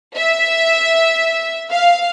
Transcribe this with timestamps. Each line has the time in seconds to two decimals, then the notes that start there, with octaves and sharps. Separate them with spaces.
0.16 E5
1.71 F5